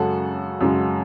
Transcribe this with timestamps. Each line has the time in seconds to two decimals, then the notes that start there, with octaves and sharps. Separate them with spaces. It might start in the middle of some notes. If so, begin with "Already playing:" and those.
Already playing: F#2 C#3 G#3 F#4 A4
0.61 F#2 C#3 G#3